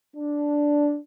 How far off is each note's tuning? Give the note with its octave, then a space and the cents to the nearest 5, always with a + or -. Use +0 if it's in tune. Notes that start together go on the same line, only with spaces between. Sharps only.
D4 -5